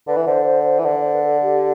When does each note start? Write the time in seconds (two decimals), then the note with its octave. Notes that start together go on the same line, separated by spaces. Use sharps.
0.08 D3 B4
0.17 E3
0.27 D3 C5
0.46 C5
0.65 C5
0.79 E3
0.85 D3 B4
0.94 D5
1.04 C5
1.14 B4
1.24 A4
1.42 G4